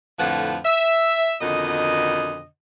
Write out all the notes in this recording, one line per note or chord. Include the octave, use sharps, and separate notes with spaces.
F2 A2 D3 F3 B4 F#5
E5
F2 B2 D3 D#3 D#5